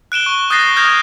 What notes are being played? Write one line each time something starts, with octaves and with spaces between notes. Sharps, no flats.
F#6 D7 E7 G7
C#6
D#6 F#6 G6 A6 A#6 C7
F6 G6 G#6 A#6 F7